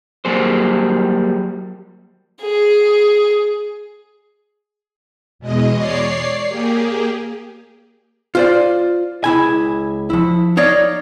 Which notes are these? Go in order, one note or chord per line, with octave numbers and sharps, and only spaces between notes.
F#3 G3 A#3 G#4 C5
G#4
E2 B2 G#3 D#5
C#5 D5 C7
A#3 G4 G#4
F4 C5 D5
C#2 E4 G#5
F3 E4
D#4 C#5 D5 F5